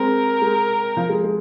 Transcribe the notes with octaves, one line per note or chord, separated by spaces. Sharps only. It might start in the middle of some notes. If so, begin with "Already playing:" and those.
Already playing: G#3 C4 A#4
G#3
F3
G#3
G#3